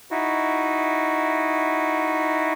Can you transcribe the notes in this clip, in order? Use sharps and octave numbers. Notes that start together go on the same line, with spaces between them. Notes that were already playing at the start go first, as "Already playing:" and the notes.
D#4 E4 F#4